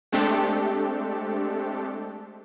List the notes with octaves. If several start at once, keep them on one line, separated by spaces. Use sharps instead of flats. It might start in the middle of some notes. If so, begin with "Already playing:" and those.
G#3 A3 C4 D4 G4 A4